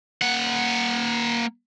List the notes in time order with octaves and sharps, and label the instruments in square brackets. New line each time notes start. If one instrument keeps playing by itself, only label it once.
[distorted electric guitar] A#3 F#5